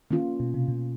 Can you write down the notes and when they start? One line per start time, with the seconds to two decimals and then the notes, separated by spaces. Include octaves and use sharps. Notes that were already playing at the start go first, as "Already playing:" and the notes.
0.11 D#3 A#3 C#4 F4
0.40 B2
0.54 C3
0.68 B2